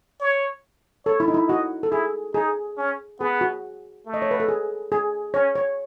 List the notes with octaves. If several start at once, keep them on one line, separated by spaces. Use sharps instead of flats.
C#5
A4 C#5
E4
D#4
E4
F#4 D#5
A4
E4 G#4
D#4 G#4
C#4
B3 G#4
F#4
A3
D#5
C#5
B4
A4
G#4
G#4
C#4 C#5
C#5